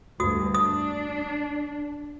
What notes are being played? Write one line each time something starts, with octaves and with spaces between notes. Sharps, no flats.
D2 G2 F#4 D#6
D4 D#6